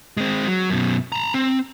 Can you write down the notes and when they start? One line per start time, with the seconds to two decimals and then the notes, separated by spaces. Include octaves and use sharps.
0.17 G#3 C4
0.48 F#3
0.70 F#2 B2
1.12 A5 A#5
1.34 C4